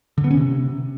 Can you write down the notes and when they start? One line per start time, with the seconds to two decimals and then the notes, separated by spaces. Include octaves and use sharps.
0.18 D3
0.24 B3
0.31 C#4
0.37 C3